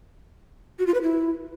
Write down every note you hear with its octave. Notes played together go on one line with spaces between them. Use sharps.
F#4
F4
B4
E4